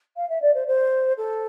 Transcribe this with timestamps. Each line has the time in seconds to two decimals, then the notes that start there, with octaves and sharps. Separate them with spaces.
0.16 F5
0.29 E5
0.42 D5
0.54 C5
0.67 C5
1.17 A4